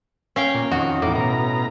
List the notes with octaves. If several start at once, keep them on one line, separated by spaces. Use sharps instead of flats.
C#4 F5 G5
A#2
F2 D#3 F#4
E2 A2 A#4 D6
B2 A#5